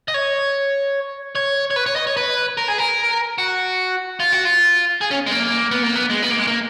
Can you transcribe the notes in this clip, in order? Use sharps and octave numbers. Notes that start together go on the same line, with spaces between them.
D#5
C#5
C#5
C#5
B4
C#5
D#5
C#5
B4
A#4
G#4
A#4
F#4
F4
F#4
F4
G#4
C#4
G#3
A#3
B3
A#3
B3
G#3
B3
A#3
G#3
A#3